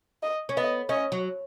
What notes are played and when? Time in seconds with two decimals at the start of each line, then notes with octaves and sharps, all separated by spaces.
0.23 D#5
0.49 C#4
0.57 B3 D#5
0.89 C#4 D#5
1.12 F#3